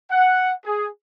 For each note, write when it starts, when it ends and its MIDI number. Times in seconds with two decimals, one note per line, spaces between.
0.11 0.52 78
0.66 0.87 68